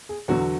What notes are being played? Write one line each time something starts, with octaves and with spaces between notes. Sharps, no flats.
G#4
E2 D3 F#3 F#4